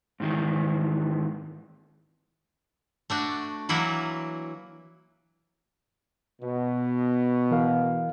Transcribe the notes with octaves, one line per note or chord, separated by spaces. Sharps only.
G#2 D#3 E3
A3 D4 F#4
E3 F#3 A#3 E4 F#4
B2
E3 A#4 F5